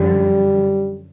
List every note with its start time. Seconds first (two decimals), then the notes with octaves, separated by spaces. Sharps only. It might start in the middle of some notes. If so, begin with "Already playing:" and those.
Already playing: F#2 D3 F3 G3